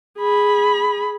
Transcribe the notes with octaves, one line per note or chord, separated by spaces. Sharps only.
G#4 B5